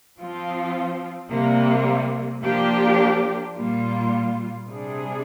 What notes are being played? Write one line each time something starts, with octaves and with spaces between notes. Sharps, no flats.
F3 C4 F4
C3 G3 A#3
F3 A#3 D4 G4
A#2 G3 A#3 F4
C3 G3 D4 G#4